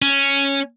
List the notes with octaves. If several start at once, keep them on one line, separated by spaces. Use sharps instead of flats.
C#4